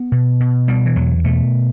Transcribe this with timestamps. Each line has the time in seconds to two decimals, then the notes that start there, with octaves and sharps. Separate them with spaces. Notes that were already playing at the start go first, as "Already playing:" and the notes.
Already playing: B3
0.12 B2
0.40 B2
0.68 B2 G3
0.86 E3
0.96 E2 F#3
1.24 B2 A3